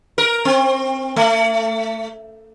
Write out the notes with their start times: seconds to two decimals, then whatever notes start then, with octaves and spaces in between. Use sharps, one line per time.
0.18 A#4
0.45 C4
1.16 A3